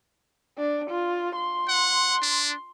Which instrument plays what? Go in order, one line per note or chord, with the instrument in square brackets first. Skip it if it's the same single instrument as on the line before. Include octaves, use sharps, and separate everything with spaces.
[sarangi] D4
F4
C6
[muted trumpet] F#5
D4